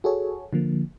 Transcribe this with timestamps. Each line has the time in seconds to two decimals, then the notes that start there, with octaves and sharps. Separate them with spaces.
0.04 F#4 G#4 A4 C#5
0.53 D3 F3 A#3